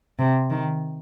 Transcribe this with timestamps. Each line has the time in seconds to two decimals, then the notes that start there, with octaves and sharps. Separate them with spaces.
0.19 C3
0.51 D#3